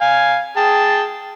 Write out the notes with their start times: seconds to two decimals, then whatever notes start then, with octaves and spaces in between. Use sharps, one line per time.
0.01 F5 G#5
0.56 G#4 G5 A5